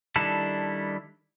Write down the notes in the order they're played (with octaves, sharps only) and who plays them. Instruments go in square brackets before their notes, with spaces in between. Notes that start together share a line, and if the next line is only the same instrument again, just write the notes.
[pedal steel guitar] D#3 G3 D4 E4 A4